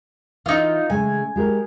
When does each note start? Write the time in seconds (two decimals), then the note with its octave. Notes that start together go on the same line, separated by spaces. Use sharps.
0.46 E3 D#4 F4
0.90 C#3 G#3 A3 G#5
1.36 G#3 G4 A#4